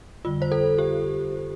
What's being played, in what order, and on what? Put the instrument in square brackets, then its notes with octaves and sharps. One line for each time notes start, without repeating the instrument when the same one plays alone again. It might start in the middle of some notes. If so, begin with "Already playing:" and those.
[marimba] F2 D3 G3 [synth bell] F4
[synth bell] C5
A4
G4